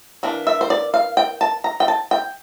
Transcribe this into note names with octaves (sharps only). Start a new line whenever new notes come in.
E3 A#3 D4
E5
C5
D5
F5
G5
A5
A#5
G5
A5
G5